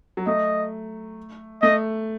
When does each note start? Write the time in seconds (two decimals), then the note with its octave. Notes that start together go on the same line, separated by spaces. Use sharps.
0.17 F#3
0.27 A3 D#5
1.62 A3 D#5